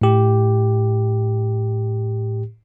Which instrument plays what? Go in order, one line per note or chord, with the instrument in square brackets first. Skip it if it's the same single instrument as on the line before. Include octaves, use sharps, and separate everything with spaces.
[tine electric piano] A2 G4